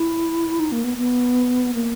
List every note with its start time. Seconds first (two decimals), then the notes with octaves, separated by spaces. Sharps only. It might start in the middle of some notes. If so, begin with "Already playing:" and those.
Already playing: E4
0.60 D#4
0.72 A#3
0.84 B3
0.98 B3
1.74 A#3